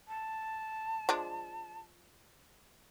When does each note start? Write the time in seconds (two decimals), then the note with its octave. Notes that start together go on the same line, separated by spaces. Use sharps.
0.08 A5
1.09 F3 G#3 D4